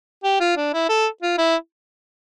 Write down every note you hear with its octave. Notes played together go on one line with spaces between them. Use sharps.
G4
F4
D4
E4
A4
F4
E4